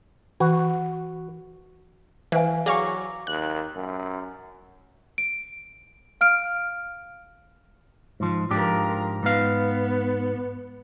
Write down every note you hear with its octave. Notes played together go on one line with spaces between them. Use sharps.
E3 F#4
E3 B4 C5 F5 F#5 G#5
F#3 G#4 D5 F5 G#5 C#6 D6 A#6
D#2 F#6
F#2
D7
F5 F6 D7
G#2 F3
G#2 F3 D4 G4 A#4
G#2 B3 F5